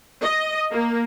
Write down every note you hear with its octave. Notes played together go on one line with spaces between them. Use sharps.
D#5
A#3